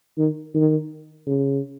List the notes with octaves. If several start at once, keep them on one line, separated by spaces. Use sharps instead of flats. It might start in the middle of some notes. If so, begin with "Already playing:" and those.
D#3
D#3
C#3